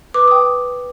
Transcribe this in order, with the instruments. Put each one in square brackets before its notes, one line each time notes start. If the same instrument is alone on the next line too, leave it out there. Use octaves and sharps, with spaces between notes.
[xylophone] B4 D6
G5 D#6